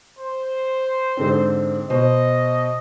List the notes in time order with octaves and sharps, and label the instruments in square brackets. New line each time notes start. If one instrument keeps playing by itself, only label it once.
[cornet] C5
[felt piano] G#2 D3 C4
[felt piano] B2 C5 [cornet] D#5